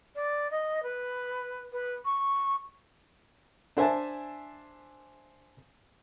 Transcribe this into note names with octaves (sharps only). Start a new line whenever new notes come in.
D5
D#5
B4
B4
C#6
D4 C5 E5 G#5 A5